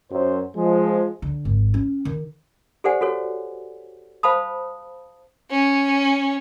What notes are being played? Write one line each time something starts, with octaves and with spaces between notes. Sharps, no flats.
F#2 C5
F3 G#3
D3
G#1
C#4
D#3
G4 A4 C5 D5 F#5 G#5
F#4 A4 C#5
C5 F5 A5 B5 D#6
C#4